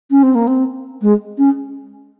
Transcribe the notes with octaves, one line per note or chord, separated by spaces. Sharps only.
C#4
C4
A#3
C4
G#3
C#4